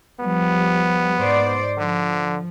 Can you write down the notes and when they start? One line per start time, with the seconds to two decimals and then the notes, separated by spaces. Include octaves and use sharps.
0.20 F3 G3 B3
1.21 G#2 C5 D5
1.78 D3 F3